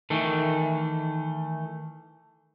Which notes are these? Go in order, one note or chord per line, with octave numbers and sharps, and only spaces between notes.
D#3 E3 A3